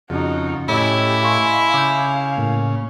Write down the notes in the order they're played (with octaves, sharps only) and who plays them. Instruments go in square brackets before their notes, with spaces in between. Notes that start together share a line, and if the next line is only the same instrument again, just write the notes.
[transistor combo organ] F2 [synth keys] C#3 C#4 [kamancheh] D#4 F#4
[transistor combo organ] A2 [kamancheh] C#4 G4 [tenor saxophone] E4 [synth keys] C#5 D#5
[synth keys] D#5 C6 C#6 [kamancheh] F5 G#5
[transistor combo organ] C#3 [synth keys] D6 G6
[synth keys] A2 A3 A#3